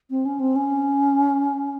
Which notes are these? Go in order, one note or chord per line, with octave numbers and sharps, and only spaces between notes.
C4
C#4
C4
C#4